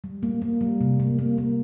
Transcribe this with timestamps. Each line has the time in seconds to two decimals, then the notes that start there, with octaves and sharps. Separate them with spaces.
0.04 G3
0.23 A#3
0.42 A#3
0.61 G3
0.81 C3
1.00 A#3
1.19 A#3
1.38 A#3